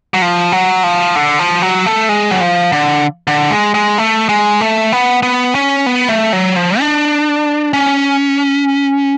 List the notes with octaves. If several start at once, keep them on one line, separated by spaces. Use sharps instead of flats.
F#3
F3
F#3
F3
D3
F3
F#3
A3
G#3
F#3
F3
D3
D3
G#3
G#3
A3
G#3
A3
B3
B3
C#4
B3
A3
F#3
F3
D4
C#4